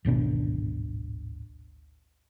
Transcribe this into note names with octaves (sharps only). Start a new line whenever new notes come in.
D1 G#1 B2 D4